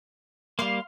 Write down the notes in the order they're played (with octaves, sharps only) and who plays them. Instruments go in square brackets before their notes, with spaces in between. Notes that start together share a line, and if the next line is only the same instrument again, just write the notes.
[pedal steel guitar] G3 A#3 [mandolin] F5 C6 F6